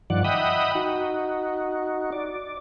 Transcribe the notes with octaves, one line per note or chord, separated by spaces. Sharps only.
G2 D#3 F3 D5 F#5
D#5 E5 F#5 G5 B5 D#6
D#4 F#4
D5